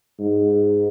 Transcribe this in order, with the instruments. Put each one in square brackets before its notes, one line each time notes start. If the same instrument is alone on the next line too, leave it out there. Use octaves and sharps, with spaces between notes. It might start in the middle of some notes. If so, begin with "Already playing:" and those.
[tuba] G#2